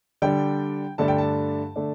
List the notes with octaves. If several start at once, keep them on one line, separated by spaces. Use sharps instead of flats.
D3 G3 D4 G5
G2 D3 A3 D4 A5
G5
A5
D3 A3 D4